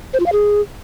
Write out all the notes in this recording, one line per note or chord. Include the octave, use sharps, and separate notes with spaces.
C5
F4
F5
G#4